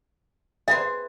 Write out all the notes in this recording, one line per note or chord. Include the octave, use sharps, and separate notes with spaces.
G#4 B4 C5 E5